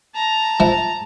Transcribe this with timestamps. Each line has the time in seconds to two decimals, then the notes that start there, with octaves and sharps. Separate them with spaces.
0.15 A5 A#5
0.60 F3 E4